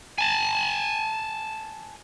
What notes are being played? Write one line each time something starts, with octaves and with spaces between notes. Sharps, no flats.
G#5 A5